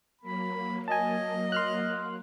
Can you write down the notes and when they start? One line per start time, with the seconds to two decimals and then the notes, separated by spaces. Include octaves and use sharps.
0.21 F#3 A#3 B5
0.88 D#5 G#5 A5
1.52 C6 F6 F#6